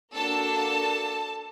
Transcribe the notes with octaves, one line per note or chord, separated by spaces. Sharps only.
A#3 D4 F#4 A4 A5